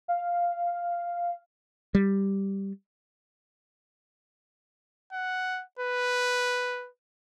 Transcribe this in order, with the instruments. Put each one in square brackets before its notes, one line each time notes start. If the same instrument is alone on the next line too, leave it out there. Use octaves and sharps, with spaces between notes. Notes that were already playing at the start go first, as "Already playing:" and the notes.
[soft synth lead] F5
[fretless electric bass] G3
[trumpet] F#5
B4